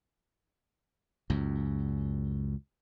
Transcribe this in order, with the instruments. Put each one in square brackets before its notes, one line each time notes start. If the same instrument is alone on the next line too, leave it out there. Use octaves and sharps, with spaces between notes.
[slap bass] C#2 F#2